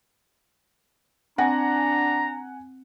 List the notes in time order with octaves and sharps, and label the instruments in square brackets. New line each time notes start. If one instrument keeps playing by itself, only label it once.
[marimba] C4 A#6 [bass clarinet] D4 [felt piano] F#5 G#5 [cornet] A#5